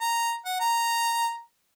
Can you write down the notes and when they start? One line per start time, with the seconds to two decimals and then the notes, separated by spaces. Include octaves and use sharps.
0.01 A#5
0.46 F#5
0.60 A#5